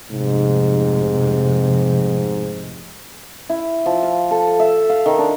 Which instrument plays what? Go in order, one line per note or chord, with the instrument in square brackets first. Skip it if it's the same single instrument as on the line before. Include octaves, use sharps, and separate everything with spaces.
[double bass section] F1 C3 [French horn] G#2
[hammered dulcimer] E4
F3
F5
A4
E5
F5
D#3
D4